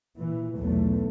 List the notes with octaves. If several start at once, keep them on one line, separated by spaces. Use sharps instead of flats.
A#2 E3
B1 E2 B2 A3